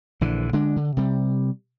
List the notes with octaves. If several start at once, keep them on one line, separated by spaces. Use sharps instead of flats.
A#1 D3 E3
D3 G#3 D4
D3
C3 G3